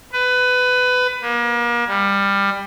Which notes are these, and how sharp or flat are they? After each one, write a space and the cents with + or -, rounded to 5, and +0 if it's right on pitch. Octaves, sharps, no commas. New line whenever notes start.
B4 +20
A#3 +35
G3 +20